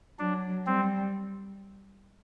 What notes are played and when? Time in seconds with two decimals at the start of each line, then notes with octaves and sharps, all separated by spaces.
0.19 F#3 D4
0.66 G3 C4